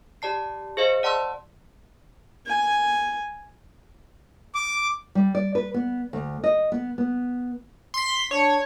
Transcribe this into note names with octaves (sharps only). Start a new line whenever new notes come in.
G4 D5 A5 C7
G#4 C5 D#5 F5
D5 F#5 A5 C6 E6
G#5
D6
G3
D5
B4
B3
D2
D#5
B3
B3
C6 B6
D4 C#5